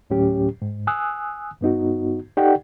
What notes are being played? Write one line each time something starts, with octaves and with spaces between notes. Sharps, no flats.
D2 A2 F#3 C#4 G4
G#2
G#5 D#6 E6 F#6
G2 B3 D#4 F#4
D#4 G4 A4 D5 F#5 G5